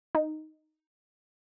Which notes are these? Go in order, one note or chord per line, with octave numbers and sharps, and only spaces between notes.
D#4